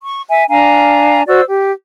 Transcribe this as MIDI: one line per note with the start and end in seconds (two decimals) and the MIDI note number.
0.02 0.21 85
0.28 0.45 76
0.28 0.45 80
0.49 1.22 62
0.49 1.22 77
0.49 1.22 80
0.49 1.22 82
1.27 1.42 66
1.27 1.42 72
1.27 1.42 74
1.27 1.42 88
1.48 1.72 67